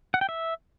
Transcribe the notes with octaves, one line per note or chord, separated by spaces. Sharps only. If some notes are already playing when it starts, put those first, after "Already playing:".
F#5
G5
E5